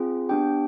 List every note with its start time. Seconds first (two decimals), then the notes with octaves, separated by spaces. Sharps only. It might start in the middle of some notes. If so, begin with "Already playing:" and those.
Already playing: C4 F4 G#4
0.29 B3 D4 G4 G5